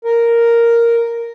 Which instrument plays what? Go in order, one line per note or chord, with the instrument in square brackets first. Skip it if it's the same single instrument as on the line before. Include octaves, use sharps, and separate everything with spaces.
[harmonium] A#4